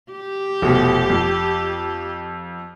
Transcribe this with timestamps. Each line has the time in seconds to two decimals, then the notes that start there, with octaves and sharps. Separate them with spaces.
0.11 G4
0.62 F1 B2
1.10 F2